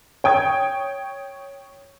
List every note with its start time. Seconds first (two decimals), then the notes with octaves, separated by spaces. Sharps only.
0.24 C#5 G5 D#6 G#6